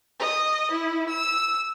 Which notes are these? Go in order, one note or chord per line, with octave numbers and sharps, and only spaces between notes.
D#5
E4
E6